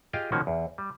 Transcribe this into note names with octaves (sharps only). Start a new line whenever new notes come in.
F4 G4 G#4 D#5 F5 G5
B2 D#3 F3 A#3 C#4 F#4
E2
G3